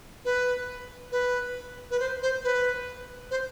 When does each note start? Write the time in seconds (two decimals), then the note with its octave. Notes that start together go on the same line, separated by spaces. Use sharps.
0.25 B4
1.12 B4
1.91 B4
2.00 C5
2.22 C5
2.44 B4
3.31 C5